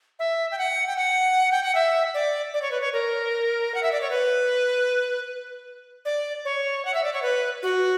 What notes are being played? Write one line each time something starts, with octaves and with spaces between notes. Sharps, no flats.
E5
G5
F#5
G5
F#5
G5
F#5
E5
D5
D5
C#5
B4
C#5
A#4
F#5
E5
D5
C#5
B4
D5
C#5
F#5
E5
D5
C#5
B4
F#4